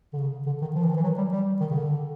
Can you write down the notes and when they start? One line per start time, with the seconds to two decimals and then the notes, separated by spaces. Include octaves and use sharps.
0.13 D3
0.18 C#3
0.46 D3
0.61 D#3
0.75 F3
0.83 E3
0.89 D#3
0.96 E3
1.03 F#3
1.18 G3
1.32 G3
1.61 D#3
1.71 C#3
1.75 D3